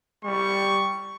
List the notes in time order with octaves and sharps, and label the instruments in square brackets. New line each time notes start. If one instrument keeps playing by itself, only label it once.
[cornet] G3 [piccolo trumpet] C#6